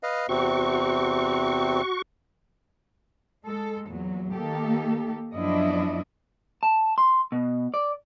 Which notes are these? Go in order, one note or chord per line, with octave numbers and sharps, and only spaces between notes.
B4 D#5 F5
E2 C3 C4 F#4 C#6
G#3 A4
E2 A#2 F#3
D#3 A#3 G4 A4
F#2 F3 B3 D4 E4 D#5
A5
C6
B2
D5